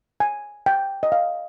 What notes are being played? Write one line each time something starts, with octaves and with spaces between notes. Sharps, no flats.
G#5
G5
D#5
F5